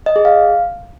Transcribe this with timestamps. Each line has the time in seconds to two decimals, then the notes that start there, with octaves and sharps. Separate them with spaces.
0.06 D#5
0.16 G#4
0.25 F5